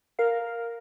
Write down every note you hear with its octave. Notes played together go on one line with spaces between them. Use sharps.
A#4 F5